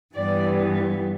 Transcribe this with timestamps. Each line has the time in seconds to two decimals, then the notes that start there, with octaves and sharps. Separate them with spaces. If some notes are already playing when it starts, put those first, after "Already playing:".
0.15 G2 E3 G3 B3 D5